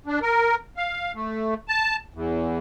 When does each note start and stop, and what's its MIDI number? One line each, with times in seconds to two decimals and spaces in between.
0.06 0.19 62
0.22 0.55 70
0.77 1.12 77
1.15 1.54 57
1.68 1.96 81
2.14 2.59 40